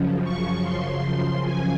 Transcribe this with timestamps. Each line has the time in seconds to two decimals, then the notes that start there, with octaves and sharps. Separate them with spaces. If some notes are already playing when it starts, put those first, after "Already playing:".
Already playing: F#2 C#3 F3
0.24 C#6
0.63 C6
1.44 G#5